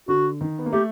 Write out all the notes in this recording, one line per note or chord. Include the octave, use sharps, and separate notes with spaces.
D3 F#4
D#3
B3
A#3
A3 G4